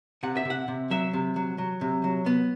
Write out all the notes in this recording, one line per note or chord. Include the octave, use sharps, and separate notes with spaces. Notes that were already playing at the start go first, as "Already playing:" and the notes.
C3 F#5
E5
C3
F#5
C3
F#3 E5
C3
F#3
F#3
C3
F#3
B3